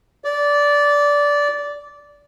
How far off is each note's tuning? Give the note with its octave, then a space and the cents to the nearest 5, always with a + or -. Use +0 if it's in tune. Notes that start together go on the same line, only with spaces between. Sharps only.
D5 -15